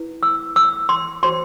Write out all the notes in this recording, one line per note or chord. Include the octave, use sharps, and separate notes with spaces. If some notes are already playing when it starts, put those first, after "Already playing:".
Already playing: E4 B4
E6
E6
C6
F#4 C5 C6